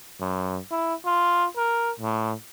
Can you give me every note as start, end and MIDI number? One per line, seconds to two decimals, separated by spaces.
0.21 0.59 42
0.71 0.94 64
1.05 1.46 65
1.57 1.91 70
2.00 2.33 45